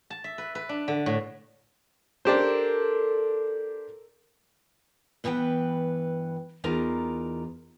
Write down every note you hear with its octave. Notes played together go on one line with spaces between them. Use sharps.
A5
E5
B4
B4
D4
D3
A2
D4 G4 A4 A#4 C5
G2 E3 B3 B4 G5
E2 D#4 F4 A#4 D5 A#5